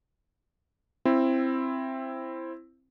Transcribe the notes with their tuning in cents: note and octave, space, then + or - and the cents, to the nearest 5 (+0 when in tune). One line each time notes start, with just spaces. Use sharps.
C4 +10 E4 +15